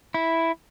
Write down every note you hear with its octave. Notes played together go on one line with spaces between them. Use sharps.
E4